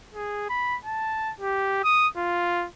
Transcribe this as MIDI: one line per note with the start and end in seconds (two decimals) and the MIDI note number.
0.14 0.48 68
0.50 0.77 83
0.85 1.32 81
1.40 1.82 67
1.84 2.08 87
2.17 2.66 65